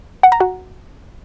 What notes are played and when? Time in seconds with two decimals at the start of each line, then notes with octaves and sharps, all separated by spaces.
0.23 F#5
0.32 A#5
0.40 F#4